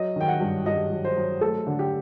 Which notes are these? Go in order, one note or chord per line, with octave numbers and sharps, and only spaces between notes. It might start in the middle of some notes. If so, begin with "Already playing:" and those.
Already playing: F#3 D#5
D#3 G5
F#5
G2
G2 D#5
F#3
C5
F#3
A3 A4
D3
G4